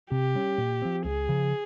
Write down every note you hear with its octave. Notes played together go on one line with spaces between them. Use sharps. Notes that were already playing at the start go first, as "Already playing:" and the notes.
C3 G4
G3 C#4
A#2
F3 C4
C#2 G#4
C#3 F3